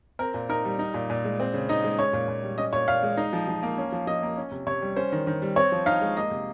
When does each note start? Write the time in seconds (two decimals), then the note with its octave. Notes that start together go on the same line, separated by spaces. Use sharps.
0.19 C4 A#4
0.34 A#2
0.49 D#4 A#4
0.65 G3
0.79 D#4
0.94 A#2
1.10 A#2
1.24 G#3
1.40 C4
1.54 C#3
1.69 D#4 D#5
1.84 G#3
1.99 C#4 C#5
2.13 A#2
2.28 A#2
2.43 G3
2.58 C#4 D#5
2.73 A#2 C#5
2.88 A#2 F5
3.03 G#3
3.17 D#4
3.33 F3
3.48 F3
3.63 A#3
3.78 C#4
3.92 F3
4.07 F3 D#5
4.23 A#3
4.37 C#4
4.52 C3
4.67 C3 C#5
4.82 G3
4.96 C#4 C5
5.12 D#3
5.27 D#3
5.42 G3
5.56 C4 C#5
5.72 F3
5.86 D#4 F5
6.01 G#3
6.16 A#3 D#5
6.31 C3